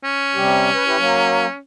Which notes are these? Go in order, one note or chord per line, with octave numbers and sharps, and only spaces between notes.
C#4
C3 G3 G4
B4
E4 G4 B4
F#3 A#3